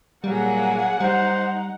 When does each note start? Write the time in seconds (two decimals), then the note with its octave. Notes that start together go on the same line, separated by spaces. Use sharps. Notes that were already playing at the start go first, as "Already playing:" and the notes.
0.24 A#2 F#3 G3 A#3 G#4 F#5
1.00 G3 D#4 C5